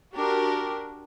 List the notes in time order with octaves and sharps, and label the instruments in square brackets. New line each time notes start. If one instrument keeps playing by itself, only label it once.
[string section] D4 F#4 G4 A#4